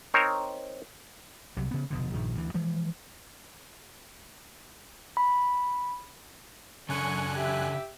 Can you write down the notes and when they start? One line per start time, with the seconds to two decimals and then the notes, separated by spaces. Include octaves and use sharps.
0.14 C4 D#4 A#4 C5 C#5
1.57 C2 C3 F#3
1.71 C#3 B3
1.90 F1 B2 D3
2.14 A#1 G2 D#3
2.35 D2 E3
2.54 E3 F3 G#3
5.17 B5
6.89 F#2 C#3 D4 A4 G#5 C#6 F#6
7.34 G4 E5